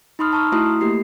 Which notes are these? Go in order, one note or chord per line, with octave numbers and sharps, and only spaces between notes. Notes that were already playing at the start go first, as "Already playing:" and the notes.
D#4 B5 C6 D#6 F6
A5 A#5 C#6 E6 F6
A3 E4 F#4 A#5 C6 D#6
A3 A#3 G4 C7